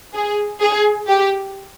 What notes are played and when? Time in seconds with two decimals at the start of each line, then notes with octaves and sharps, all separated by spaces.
0.14 G#4
0.61 G#4
1.08 G4